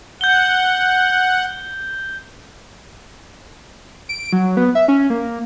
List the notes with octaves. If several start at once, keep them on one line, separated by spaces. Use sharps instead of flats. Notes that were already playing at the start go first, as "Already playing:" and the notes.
F#5 G6 G7
D7
F#3
B3
E5
C#4
A#3